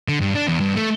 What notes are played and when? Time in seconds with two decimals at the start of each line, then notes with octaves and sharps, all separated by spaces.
0.08 D3
0.20 G2
0.35 D4
0.47 E2
0.60 G2
0.75 A3